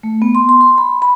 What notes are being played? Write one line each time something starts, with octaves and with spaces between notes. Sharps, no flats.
A3
B3
C6
C6
C6
B5
B5